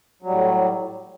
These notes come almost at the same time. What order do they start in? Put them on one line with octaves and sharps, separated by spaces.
F#3 G3 A2